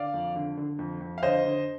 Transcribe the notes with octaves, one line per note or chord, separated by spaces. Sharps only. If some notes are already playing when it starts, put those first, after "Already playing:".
Already playing: D3 D5 F5
F2
D3
D3
F2
F2
F5
D3 C5 D#5
D3